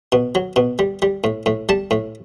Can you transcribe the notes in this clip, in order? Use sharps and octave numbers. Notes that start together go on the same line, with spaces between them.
B2
F#3
B2
G3
G3
A2
A2
G3 A5
A2